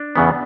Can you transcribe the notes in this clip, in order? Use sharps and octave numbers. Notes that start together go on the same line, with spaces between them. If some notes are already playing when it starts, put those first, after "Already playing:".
Already playing: D4
E2 C#3 E3 B3